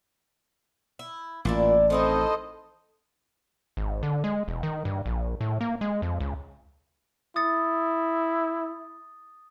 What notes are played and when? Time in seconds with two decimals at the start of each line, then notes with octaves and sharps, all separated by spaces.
0.99 E4
1.45 A1 A#2 D4 E4 D5
1.90 D#3 C4 D#4 E4 A4 C5 D#5
3.77 G#1
4.03 D3
4.24 G#3
4.48 E1
4.63 D#3
4.85 G2
5.06 A#1
5.41 A2
5.61 A#3
5.81 G#3
6.02 F2
6.20 C#2
7.36 E4 D#6 A6 C#7